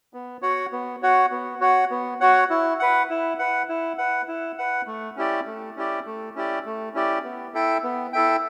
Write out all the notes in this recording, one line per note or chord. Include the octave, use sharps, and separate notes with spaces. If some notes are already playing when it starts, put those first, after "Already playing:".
B3
F#4 C#5 F#5
B3
F#4 C#5 F#5
B3
F#4 C#5 F#5
B3
F#4 C#5 F#5
E4
B4 F#5
E4
B4 F#5
E4
B4 F#5
E4
B4 F#5
A3
C#4 E4 G4 D5
A3
C#4 E4 G4 D5
A3
C#4 E4 G4 D5
A3
C#4 E4 G4 D5
B3
E4 A4 E5 G5
B3
E4 A4 E5 G5